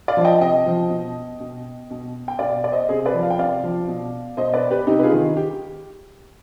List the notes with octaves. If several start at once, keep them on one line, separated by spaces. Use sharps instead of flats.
D5 F5
F3
D#5 G5
C3 D#5 G5
F3
B2
B2
B2
G5
B2 D5 F5
D5
C5 D#5
C3 G#4 C5
B4 D5
F3
F5
G5
C3 D5 F5
F3
B2
B2 C5 D#5
B4 D5
G4 B4
C3 D#4 G4
B4
F4 G#4
D#3
G4